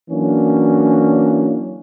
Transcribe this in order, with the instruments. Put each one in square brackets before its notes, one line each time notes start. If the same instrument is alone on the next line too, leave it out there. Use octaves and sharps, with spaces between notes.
[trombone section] E3 F#3 A#3 C#4 D4